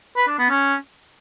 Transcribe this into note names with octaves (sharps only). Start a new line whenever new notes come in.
B4
D4
B3
C#4